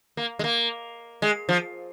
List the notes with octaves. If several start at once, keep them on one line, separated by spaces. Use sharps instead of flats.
A#3
G#3
A#3
G#3
F3